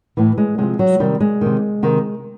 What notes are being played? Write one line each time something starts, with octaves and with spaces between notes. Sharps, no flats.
A2 E3
G#3
C3 F3 G#3
F#3
C3 D#3 G3
G#3
C3 D#3
C3 D#3